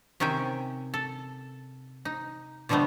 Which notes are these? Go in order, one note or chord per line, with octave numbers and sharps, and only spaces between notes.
C3 D#3 C#4 E5 G5
A4
D#4
B2 D3 F3 G3 A3 B3